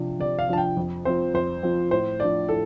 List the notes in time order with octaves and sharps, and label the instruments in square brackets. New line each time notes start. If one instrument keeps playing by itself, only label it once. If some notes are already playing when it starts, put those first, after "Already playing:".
Already playing: [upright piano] C3 F3 D4
[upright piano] C3 [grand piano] D5
[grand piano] F5
[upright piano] F3 D4 [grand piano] A5
[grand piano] G5
[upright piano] F2
[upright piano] F3 C4 [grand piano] C5
[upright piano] F2 [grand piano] C5
[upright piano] F3 C4
[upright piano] A2 [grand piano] C5
[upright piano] F3 D4 [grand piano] D5
[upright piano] A2 [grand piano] A4